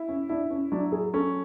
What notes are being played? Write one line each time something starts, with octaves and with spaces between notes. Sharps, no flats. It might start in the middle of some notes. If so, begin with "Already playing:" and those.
Already playing: E4
C#4
D4 E4
C#4
F#3 D4
G#4
C#4 A4